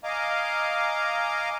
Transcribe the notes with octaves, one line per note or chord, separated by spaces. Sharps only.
D#5 F5 G#5 A#5 D6